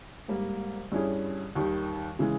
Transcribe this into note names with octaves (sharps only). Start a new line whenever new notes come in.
G#2 G3 A#3
G2 G3 C#4 E4 G#4
D#2 D#3 G3
C#3 E3 G#3